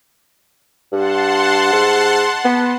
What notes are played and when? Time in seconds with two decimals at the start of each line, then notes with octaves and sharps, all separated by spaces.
0.92 G2 F#5 A5 C6
1.73 G#2
2.45 B3